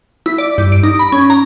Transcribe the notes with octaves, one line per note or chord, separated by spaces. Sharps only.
E4
D5
G2
D7
D#4
B5
C#4
A#5